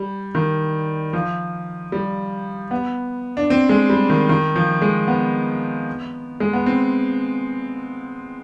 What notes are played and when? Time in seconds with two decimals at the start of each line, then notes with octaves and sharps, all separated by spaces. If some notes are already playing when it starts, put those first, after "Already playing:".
Already playing: G3
0.35 D#3
1.13 F3
1.92 G3
2.71 B3
3.37 D4
3.50 C4
3.69 G#3
3.90 G3
4.09 D#3
4.29 D#3
4.55 F3
4.82 G#3
5.08 B3
6.40 G#3
6.53 B3
6.66 C4